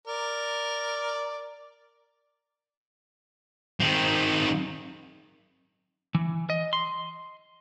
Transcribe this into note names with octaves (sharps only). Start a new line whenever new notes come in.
A#4 D5
D#3 C4
E3
D#5
C6